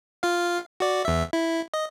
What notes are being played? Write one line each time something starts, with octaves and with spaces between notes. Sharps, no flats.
F4 F5
F#4 D5
E2 E5
E4
D#5